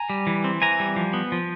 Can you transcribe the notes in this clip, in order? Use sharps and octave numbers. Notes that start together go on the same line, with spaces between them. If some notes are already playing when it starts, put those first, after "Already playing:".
Already playing: G#5 A#5
G3
E3
C4
E3 G#5 A#5
G3
F3
B3
F3